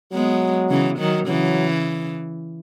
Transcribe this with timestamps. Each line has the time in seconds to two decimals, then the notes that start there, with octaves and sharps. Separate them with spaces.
0.13 F#3 G#3 B3
0.70 C#3 E3
0.98 D#3 F#3
1.27 C#3 E3 F#3